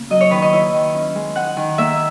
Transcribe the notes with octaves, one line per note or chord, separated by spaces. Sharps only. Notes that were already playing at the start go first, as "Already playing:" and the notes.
Already playing: C#3 A#3
F#3 D#5
C#5
D#3 B4
D#5
E4
D#3
C#4
G#3
D#4 F#5
D#3
A#3 E5